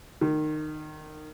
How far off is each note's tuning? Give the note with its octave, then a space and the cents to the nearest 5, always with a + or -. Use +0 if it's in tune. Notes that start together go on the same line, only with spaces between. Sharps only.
D#3 -20